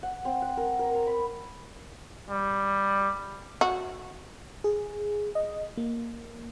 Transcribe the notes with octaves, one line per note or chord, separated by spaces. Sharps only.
F#5
C4
F#5
A#4
A#4
A#5
B5
G3
F#4
G#4
D#5
A#3